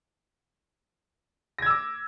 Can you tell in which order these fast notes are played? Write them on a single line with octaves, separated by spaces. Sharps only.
A#6 G#6 E6 D6